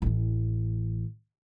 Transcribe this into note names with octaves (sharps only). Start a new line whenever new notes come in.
A1 E3